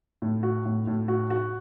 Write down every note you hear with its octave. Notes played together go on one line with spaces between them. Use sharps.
A2
F#4
A2
A2
F#4
F#4